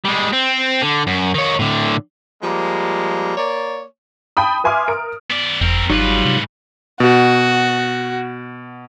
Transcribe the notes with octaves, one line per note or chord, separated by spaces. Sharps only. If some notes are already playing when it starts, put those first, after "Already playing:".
G3 G#3
C4
D3
F#2
D#3 C#5
A2 D3
F3 G3 G#3 A#3
A#3 C#5 D5
G5 A5 B5 D#6
B4 E5 G#5 C6 D6 F6
A#4 D7
B3 D5
F#1 F2 C4 A#4
G1 G#2 F#3 G3 D#4 F4 B4
C3
B2 F#4